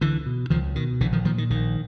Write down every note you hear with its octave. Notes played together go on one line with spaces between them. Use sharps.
C#2 D3 E3
B2
C#2 D#3 F3
B2 D#3
A#1 D3 E3
D#3 F3
A#2 D#3 F3
D#3
A#1 D#3